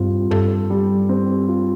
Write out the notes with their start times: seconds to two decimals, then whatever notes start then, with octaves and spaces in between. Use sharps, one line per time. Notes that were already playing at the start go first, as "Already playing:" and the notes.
Already playing: G2 G3 C4 F4
0.31 G2 A4
0.70 G3
1.09 C4
1.48 F4